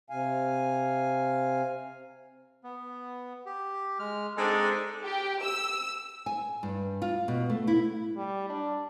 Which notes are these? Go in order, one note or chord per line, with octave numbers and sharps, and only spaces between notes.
C3 F5 G#5
B3
G4
G#3 F6
G#3 C4 D4 D#4 A4
G4
E6
G#5
G2
F4
B2
A3
E4
G3
D4